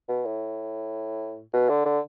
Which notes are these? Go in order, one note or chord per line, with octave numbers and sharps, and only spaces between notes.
B2
A2
B2
D3
D3